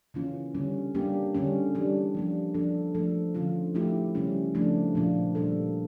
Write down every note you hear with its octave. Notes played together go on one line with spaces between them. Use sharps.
C#3 E3 A#3 C#4 F4
D3 G3 C#4
G3 A#3 D4 G4
D3 G3 C#4
E3 G3 D4
F3 A#3 D4
F3 A#3 D4 A4
F3 A3 D4 A4
D3 F3 C#4 F4
F3 A3 E4 G4
C#3 G3 C#4
C#3 F3 A3 D4
A#2 F3 A#3 D4 F4
A#2 G3 A#3 D4 A4